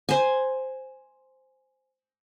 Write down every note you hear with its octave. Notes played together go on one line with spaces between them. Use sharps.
C5 G#5